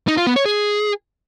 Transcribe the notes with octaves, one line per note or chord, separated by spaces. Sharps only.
D#4
F4
B3
C#5
G#4